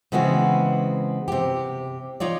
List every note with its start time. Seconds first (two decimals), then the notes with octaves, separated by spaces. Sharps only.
0.12 C#3 E3 G#3 B3 C4 F#4
1.28 C3 G4
2.20 D#4 F4 C#5 D5